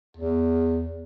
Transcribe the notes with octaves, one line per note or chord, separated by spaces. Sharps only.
E2